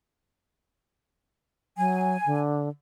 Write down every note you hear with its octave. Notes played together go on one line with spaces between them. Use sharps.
F#3 G#5
D3